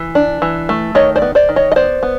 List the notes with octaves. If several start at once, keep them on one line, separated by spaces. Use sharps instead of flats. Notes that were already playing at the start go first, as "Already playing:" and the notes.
Already playing: E3
D4
E3
A3
D#3 C#5 D#5
C5 D5
B3
C5 D5
D#3
C#5 D#5
D#5
B3 C5 D5
B3